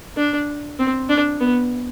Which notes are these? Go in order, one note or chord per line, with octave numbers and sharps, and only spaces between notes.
D4
C4
D4
B3